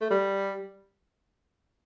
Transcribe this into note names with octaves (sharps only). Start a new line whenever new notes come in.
A3
G3